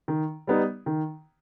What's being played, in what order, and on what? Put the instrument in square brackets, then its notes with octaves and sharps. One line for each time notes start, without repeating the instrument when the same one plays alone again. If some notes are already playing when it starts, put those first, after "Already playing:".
[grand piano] D#3
G3 B3 D#4
D#3